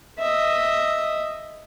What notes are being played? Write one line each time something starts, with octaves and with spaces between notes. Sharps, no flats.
D#5 E5